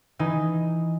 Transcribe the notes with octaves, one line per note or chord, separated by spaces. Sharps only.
E3 D#4